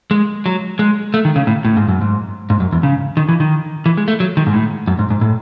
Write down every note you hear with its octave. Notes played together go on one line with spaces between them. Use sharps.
G#3
F#3
G#3
A3
D#3
C#3
A2
A2
G#2
F#2
G#2
G#2
F#2
E2
C#3
D#3
E3
D#3
E3
G#3
A3
F#3
D#3
G#2
A2
F#2
G#2
G#2
A2